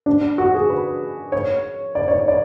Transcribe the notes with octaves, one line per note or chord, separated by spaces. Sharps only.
D4
F#4
G#4
B4
C#5
D5
C#5
D5
D5